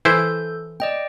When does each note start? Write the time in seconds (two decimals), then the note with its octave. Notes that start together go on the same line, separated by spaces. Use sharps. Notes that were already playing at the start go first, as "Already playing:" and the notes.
0.05 E3 E4 A4 C5 G6
0.80 D5 D#5 G5